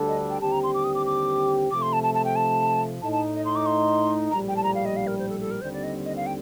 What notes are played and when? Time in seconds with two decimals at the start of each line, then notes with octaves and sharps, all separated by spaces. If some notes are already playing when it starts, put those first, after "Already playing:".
Already playing: D2 D3 G3 D4 A4
0.08 D#5
0.30 G5
0.41 D#2 D3 G3 C4 G4 A5
0.52 A#5
0.63 C6
0.74 D6
0.84 D#6
0.95 D6
1.06 D6
1.71 C3 F3 A3 D6
1.82 C6
1.93 A5
2.03 A5
2.14 A5
2.25 G5
2.36 A5
3.01 A2 A3 D#4 A5
3.12 A5
3.34 D#5
3.45 C6
3.56 D6
3.66 C6
4.31 A#1 A2 G3 A#5
4.48 G5
4.56 A5
4.63 A#5
4.75 F5
4.85 D#5
4.96 F5
5.07 A#4
5.19 C5
5.29 A4
5.40 A4
5.51 A#4
5.61 D#2 D3 G3 C4 C5
5.73 D5
5.83 D#5
6.05 D#5
6.16 F5
6.26 G5